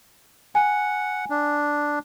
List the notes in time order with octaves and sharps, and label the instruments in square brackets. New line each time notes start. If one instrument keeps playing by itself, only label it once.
[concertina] F#5 [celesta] G#5
[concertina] D4